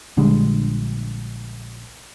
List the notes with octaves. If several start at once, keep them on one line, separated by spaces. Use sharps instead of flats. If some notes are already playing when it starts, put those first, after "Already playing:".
A#1 D3 G3 G#3